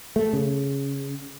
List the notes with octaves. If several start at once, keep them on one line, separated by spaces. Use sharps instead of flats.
A3
C#3